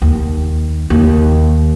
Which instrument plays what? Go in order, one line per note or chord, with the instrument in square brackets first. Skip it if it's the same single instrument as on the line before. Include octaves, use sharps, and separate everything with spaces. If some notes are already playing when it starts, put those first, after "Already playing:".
[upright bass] D#2
D#2